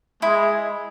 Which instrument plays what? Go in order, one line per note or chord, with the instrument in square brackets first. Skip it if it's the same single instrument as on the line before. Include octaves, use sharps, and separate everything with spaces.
[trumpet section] G#3 [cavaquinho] E4